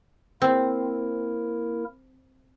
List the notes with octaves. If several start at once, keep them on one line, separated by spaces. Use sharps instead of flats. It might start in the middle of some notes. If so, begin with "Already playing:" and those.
A#3 C4 E4 A#4